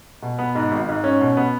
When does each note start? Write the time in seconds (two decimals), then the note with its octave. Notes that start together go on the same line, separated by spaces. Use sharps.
0.22 B2
0.39 B3
0.55 G#2
0.72 G#1
0.88 G#2
1.04 C#4
1.21 B2
1.37 B3